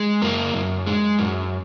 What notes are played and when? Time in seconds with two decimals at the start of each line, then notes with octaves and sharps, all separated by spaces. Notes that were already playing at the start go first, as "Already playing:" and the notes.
Already playing: G#3
0.22 F#2 A#3
0.54 F#2
0.87 G#3
1.19 F#2